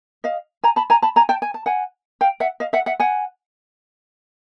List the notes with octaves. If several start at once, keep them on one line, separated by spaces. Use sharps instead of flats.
D#5 F5
G#5 A#5
A5 B5
G#5 A#5
A5 B5
G#5 A#5
G5 A5
G#5
A5
F#5 G#5
F5 G5
E5 F#5
D#5 F5
E5 F#5
E5 F#5
F#5 G#5